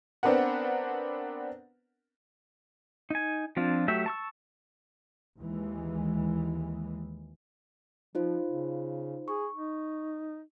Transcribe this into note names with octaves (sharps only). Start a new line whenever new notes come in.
B3 C4 D4 A#4 B4 F#5
D#4 G#5
F3 C4 D4 F4
F#3 A3 G4 E5
A5 C#6 E6
D#2 E3 G#3
F3 D#4 F4 C5
C#3
G#4 C#6
D#4